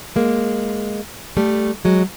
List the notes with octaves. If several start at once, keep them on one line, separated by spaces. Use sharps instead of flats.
G#3 A#3
G3 A3
F#3 G#3